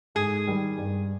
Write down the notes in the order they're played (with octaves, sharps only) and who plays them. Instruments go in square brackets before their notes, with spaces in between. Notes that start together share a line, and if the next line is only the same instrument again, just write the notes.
[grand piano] G#2 [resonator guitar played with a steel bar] G#4
[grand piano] D#3 G3
G2